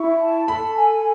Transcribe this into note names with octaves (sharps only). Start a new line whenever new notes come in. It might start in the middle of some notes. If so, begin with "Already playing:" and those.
Already playing: E4 C#6
A5
A4 B5
G#5